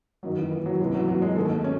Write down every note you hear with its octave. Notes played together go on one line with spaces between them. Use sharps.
F#2 D#3 F#3
E3
E3
F#3
C#2 C3 E3
F#3
F#3
G#3
D#2 D#3 A3
C#4